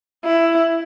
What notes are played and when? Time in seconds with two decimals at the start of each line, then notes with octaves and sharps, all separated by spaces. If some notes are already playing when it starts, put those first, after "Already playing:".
0.25 E4